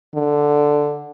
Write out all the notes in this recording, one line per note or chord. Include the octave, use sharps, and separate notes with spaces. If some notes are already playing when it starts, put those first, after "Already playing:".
D3